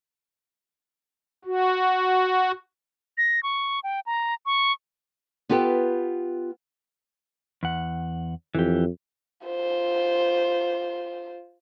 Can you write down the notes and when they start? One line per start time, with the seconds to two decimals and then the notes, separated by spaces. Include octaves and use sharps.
1.45 F#4
3.18 A#6
3.43 C#6
3.84 G5
4.06 A#5
4.46 C#6
5.49 B3 F4 G4 A4 B4 G5
7.63 E2 F#5
8.55 F2 E3 G4
9.45 F4 C5